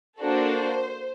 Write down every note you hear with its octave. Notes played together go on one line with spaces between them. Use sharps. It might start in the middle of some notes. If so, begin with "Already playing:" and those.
A#3 D4 F#4 A4 C5